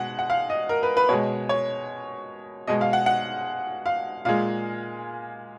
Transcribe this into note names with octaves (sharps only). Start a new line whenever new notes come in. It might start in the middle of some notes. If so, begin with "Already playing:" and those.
Already playing: B2 G#3 F#5
F#5
F5
D#5
A#4
B4
B4
B2 G#3 C#5
C#5
B2 G#3 D#5
F5
F#5
F#5
F5
A#2 G#3 F5